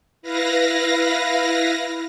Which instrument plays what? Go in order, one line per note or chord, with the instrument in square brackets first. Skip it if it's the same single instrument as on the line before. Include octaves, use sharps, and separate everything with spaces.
[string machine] E4 B4 F5 A#6